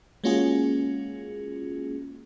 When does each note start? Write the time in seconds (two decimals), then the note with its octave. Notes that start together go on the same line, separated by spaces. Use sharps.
0.24 G#3 A#3 C#4 F4 F#4 G#4